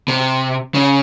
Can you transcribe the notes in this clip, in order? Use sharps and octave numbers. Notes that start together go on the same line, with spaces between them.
C3
C#3